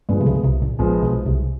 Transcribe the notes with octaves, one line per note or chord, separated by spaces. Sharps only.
G2 F3 G3 G#3 B3
C3
C#2 C#3
C2 C3
A#1 A#2
A#1 A#2 F3 G#3 B3
B1 B2
C2 C3